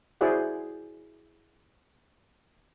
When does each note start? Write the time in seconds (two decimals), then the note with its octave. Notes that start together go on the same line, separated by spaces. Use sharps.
0.21 E4 F#4 G#4 C5 D5 F#5